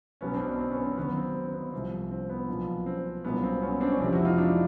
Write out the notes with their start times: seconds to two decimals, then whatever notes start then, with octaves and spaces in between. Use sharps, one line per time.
0.21 B1 B2 F#3 B3 C#4
0.34 C4 D4
0.46 B3
0.59 C4
0.71 B3 C#4
0.85 C4
0.97 D#2 D#3 F#3 B3
1.16 C4
1.34 C4
1.54 B3
1.72 C2 C3 F3 C4
2.11 C4
2.30 B3
2.48 B1 A#2 F3
2.86 C4
3.24 C2 A#2 F#3 B3
3.43 C4
3.62 B3 C#4
3.80 C4 D4
3.92 C#4
4.00 F1 F2 C3 E3 C4
4.12 E4 F#4
4.25 D#4 F4
4.37 D4 E4